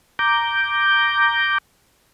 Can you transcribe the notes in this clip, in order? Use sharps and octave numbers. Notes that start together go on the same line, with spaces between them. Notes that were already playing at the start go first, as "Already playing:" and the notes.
A#5 D6 G6